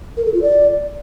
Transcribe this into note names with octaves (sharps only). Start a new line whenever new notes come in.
A#4
A4
F4
D5